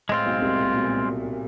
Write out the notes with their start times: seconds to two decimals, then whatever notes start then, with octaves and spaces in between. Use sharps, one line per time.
0.09 A2 G#3 C4 F4
0.26 B1 B2
0.42 C2 C3
0.59 A#2
0.75 B2
0.83 A#2